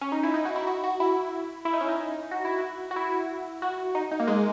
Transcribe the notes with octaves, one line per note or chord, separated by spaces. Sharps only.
C#4
D#4
E4
D#4
F#4
E4
F#4
F#4
E4
E4
D#4
C#4
D#4
F#4
E4
F#4
F#4
E4
F#4
D#4
D#4
A#3
G#3